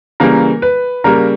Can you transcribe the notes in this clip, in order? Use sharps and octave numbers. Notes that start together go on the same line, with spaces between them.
C#3 E3 G3 A#3 A#4
B4
C#3 G3 A#3 A#4